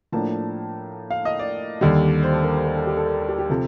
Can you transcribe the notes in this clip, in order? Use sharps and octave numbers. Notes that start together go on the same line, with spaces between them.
A2 F3 A#3 D4 A5
F5
D#5
D5
D#2 D3 G3
C5
A4
A#4
C5
A#4
A4
G4
A4
A#4
A4
G4
G4
C3 F3 A4